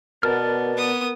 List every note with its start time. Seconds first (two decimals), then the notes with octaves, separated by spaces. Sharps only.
0.23 B2 B3 A#4 D5 A5 F6
0.75 B3 D#6